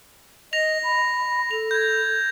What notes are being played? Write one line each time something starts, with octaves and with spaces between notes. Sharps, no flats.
D#5 A#6 F7
B5
A4 F7
G6 G#6